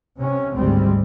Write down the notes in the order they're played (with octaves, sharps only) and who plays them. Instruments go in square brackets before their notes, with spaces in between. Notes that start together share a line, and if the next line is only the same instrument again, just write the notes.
[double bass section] C3 C#4
G#1 D2 G3 G#3 C4